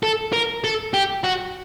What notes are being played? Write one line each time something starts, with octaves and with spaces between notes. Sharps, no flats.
A4
A#4
A4
G4
F#4